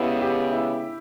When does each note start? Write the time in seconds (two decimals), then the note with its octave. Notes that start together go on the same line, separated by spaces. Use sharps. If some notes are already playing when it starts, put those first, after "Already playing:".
Already playing: C#3 G#3 B3 E4 G4
0.21 G4
0.53 E4